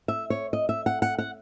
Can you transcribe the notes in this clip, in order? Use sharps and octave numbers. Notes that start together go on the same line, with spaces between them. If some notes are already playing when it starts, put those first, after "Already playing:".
E5
C#5
D#5
E5
F#5
F#5
F#5